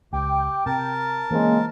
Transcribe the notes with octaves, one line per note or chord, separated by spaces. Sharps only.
C#2 G4 G5
C3 A#4 A5
C#3 E3 G#3 A#3 C4